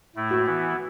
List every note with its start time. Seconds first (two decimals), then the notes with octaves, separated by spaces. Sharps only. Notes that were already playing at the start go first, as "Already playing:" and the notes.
0.16 A2 A3 E4
0.31 F#4
0.45 E3 B3 E4